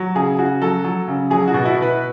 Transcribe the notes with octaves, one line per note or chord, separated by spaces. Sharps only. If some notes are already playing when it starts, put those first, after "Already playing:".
Already playing: F#3
C#3 G#4
C#3 F#4
F#3 A4
F#3
C#3
F#3 G#4
F#4
B2
E4
B2
B4